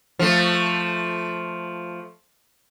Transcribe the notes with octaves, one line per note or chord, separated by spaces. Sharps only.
F3 A3